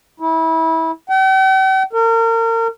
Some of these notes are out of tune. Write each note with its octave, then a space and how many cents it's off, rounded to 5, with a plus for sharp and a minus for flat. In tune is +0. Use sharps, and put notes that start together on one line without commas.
E4 -25
G5 -45
A#4 -35